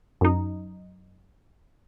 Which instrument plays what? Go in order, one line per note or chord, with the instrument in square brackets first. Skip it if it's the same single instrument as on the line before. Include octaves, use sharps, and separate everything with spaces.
[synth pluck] F#2 D#4